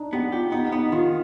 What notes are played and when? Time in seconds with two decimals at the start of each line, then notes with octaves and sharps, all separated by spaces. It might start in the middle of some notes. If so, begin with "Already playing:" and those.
Already playing: D4 D#4
0.13 B3 G4
0.32 F4 G4
0.52 B3 D#4
0.72 B3 D#4
0.92 D#3 F4